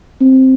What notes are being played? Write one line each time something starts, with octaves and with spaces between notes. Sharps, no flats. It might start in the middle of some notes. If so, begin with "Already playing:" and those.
C4